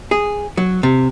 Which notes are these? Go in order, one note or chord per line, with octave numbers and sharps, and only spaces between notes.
G#4
F#3
C3